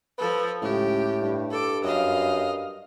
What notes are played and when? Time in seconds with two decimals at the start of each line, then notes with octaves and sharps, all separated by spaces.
0.18 F3 A4 B4
0.62 C#2 A2 G4
1.21 G2
1.51 A4 D6
1.84 F#2 D#5 F5